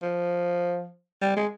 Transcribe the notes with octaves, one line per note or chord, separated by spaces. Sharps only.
F3
G3
G#3